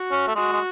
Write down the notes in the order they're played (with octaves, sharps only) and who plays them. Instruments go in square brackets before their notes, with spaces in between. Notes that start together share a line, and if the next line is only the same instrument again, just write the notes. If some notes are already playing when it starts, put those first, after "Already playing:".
Already playing: [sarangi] F#4
[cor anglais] C#4
A3
[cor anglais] G#3 [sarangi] F#4
[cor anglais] G#3